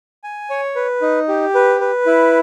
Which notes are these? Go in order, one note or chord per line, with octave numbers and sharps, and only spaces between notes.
G#5
C#5
B4
D#4
G4
B4
B4
E4